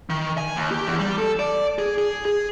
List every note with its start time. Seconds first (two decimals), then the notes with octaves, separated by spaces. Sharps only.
0.10 D#3
0.38 G#5
0.56 D#2
0.71 G4
0.87 E2
0.99 G3
1.18 A4
1.39 D5
1.78 G#4
1.98 G#4
2.25 G#4